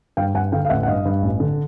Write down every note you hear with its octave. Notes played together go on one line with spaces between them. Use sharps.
G2 F5 G5
G2 F#5 G#5
D3 F5 G5
F5
A1 E5 F#5
F#5
G2 D#5 F5
G2
A1
D3